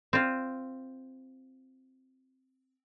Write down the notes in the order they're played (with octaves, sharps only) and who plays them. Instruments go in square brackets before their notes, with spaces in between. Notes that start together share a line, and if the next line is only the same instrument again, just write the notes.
[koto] C4 F4